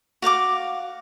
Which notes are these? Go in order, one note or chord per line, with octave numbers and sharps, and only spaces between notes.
F#4 F5 F#5 D6